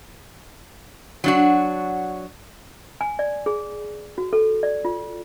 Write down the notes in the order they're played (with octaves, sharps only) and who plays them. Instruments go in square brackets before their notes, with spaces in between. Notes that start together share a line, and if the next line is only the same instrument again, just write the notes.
[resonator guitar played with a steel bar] F#3 D4 F#4
[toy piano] G#5
D5
G#4
F#4
A4
D5
F4